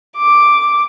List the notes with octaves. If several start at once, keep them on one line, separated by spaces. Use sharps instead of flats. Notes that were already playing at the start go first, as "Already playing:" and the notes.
D6